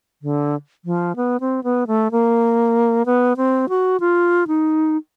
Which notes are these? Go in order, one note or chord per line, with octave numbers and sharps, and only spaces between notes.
D3
F3
B3
C4
B3
A3
A#3
B3
C4
F#4
F4
D#4